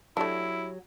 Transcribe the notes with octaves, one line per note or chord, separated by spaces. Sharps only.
F#3 A3 D4 E4 G4 C#5